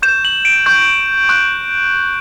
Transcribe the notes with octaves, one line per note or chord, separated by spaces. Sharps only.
C#6 G6 E7
F#7
D7
C#6 G6
C#6 F#6